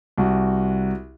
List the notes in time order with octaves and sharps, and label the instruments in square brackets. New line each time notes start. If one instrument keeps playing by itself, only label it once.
[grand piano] C2 F#4